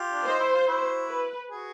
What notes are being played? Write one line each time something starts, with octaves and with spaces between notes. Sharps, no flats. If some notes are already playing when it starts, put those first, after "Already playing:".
Already playing: F4 G4
D4
D#4 C5
E4
F4
E4 F#4
B4
F#4 G#4